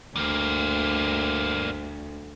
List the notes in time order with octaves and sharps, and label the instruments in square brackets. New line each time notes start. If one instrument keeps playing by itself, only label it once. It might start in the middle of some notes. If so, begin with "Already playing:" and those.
[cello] D2 [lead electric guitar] G2 A#3